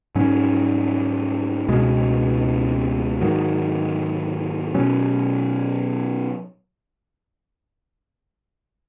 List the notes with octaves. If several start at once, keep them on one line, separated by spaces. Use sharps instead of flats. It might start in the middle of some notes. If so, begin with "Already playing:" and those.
G#2 F#3 C#4
C#2 B2 G#3
G#2 D#3 F#3
B2 F#3 C#4